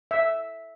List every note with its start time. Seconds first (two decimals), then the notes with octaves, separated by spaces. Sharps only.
0.11 E5